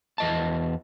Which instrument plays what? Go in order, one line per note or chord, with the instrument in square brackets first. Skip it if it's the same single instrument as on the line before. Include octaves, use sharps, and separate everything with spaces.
[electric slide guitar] E2 D#5 A5